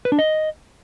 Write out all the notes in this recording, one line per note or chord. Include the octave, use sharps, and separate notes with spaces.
B4
D4
D#5